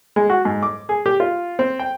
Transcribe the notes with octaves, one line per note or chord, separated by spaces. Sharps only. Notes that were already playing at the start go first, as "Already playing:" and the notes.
G#3
F#4
G#2
D6
G#4
G4
F4
C4
G5